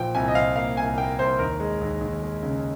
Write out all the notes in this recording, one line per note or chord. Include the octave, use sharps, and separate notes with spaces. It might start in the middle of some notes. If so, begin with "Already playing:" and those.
Already playing: A#2 F3 G5
C2 G#5
D#5
F3 F5
A#3 F5
C2 G#5
A#3 G5
C2 C5
D#2 A#4
G#3
D#2
D#2
G#3
C#3